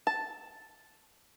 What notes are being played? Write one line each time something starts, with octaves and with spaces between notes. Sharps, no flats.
A5